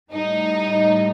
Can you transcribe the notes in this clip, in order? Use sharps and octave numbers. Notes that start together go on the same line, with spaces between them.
A2 G3 D#4